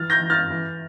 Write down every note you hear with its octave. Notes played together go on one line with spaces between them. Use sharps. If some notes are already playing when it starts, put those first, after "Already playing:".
Already playing: E3 F6 A6
G6 A#6
E3
F6 A6
E3